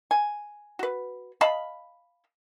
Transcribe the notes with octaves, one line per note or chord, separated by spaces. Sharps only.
G#5
F#4 B4
D#5 F5 A5 B5